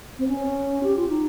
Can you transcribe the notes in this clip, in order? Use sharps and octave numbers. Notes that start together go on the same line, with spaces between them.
C4
C#4
G4
F4
D#4